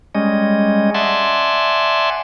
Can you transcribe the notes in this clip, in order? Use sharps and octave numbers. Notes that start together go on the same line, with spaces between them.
G3 G#3 C#4 D#5
D5 E5 F#5 G#5 A5 C6